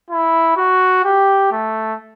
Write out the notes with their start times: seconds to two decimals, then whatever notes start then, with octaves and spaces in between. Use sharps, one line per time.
0.10 E4
0.57 F#4
1.04 G4
1.52 A3